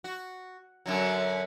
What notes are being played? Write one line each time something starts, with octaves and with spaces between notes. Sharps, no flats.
F#4
F#2 D3 F#3